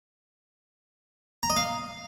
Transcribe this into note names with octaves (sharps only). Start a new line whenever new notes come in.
A#5
D#5
F5